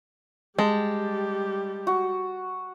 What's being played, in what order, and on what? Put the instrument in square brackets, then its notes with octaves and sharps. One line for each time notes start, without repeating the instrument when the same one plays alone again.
[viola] G3 G4 [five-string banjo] G#3 [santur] A5
[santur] F#4